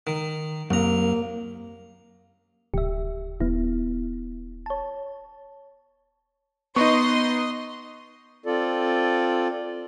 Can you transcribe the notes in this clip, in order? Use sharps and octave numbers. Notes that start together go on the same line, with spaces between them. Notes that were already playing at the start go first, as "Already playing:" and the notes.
D#3
C2 F#2 A#3 A#5
D1 G4 E5
D#1 B3 E4
C#5 A5
B3 D#4 D#5 C6 C#6
C4 F4 A4 D5